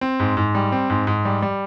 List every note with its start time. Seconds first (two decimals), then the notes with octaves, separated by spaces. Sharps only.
0.01 C4
0.20 G#2
0.37 G#2
0.55 G3
0.72 C4
0.90 G#2
1.07 G#2
1.25 G3
1.42 G3